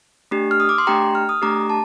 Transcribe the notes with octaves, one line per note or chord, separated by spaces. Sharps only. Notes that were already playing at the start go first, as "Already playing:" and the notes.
A3 D4 G4
F6
D#6
D6
C6
A3 D4 G4 G5 A#5
F6
D#6
A3 D4 G4 A#5 D6
A5